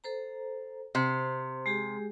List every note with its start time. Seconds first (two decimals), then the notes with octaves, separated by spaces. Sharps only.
0.04 A4 C5 A#5
0.95 C3 C5
1.66 G#3 G4 G#4